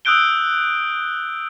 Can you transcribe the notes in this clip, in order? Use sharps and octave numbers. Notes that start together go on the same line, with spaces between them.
D#6 E6 F#6 G6 D7 G7